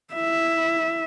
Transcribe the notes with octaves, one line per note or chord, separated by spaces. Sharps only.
E4 E5